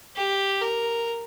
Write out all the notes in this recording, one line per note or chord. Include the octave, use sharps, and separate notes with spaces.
G4
A#4